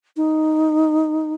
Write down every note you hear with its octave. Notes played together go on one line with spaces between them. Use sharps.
D#4